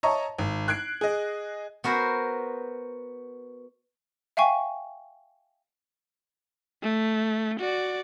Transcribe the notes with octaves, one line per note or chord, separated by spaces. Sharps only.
C#5 D#5 E5 A5 A#5 C#6
G#1
F#6 G#6 C7 D7
G#4 D#5
B3 F#4 A#4 C5 G#5
E5 F5 G5 G#5 C#6
A3
F#4 D5